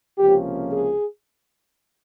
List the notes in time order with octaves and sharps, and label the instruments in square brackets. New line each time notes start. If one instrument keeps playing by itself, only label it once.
[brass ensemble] C#2 C3 F3 A#3 C#4 G4
G#4